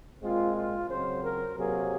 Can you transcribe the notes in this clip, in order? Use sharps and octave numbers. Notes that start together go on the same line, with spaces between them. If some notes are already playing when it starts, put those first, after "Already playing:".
A#2 G#3 C4 F4
F4
C#3 F#3 C4 C5
A#4
C3 F#3 A#3 G#4